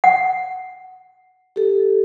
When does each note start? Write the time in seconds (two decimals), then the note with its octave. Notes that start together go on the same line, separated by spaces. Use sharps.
0.04 F#5
1.56 G4 A4